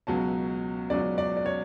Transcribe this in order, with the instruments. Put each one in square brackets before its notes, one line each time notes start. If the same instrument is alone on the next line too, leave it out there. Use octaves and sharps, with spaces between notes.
[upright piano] C#2 B2 F#3 C#4 A5
C#2 B2 F#3 C#4 D5
D5
D5
C#5